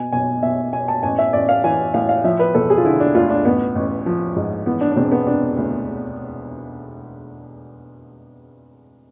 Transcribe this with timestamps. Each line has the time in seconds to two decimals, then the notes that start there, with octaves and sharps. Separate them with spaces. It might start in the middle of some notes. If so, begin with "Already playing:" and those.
Already playing: B2 G#5
0.12 B1 G#5
0.43 B1 E5
0.73 B2 G#5
0.88 A5
1.03 A1 G#5
1.18 E5
1.33 A1 D5
1.49 F5
1.64 E3 G#5
1.94 A2 F5
2.09 F5
2.24 F3 E5
2.39 B4
2.55 E1 A4
2.70 G#4
2.78 F4
2.85 D3 E4
3.00 D4
3.15 D2 F4
3.30 D4
3.45 A1 B3
3.75 A1
4.06 F3
4.36 G#2
4.66 E3 B3
4.81 D4
4.92 D4
4.97 E1 C4
5.12 B3
5.27 C3 D4
5.57 D2